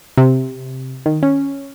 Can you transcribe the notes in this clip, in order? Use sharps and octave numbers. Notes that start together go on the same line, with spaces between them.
C3
D#3
C#4